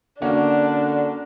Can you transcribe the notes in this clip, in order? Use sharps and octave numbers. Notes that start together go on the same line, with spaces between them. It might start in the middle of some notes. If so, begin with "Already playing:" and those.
D3 A#3 C#4 D4 F#4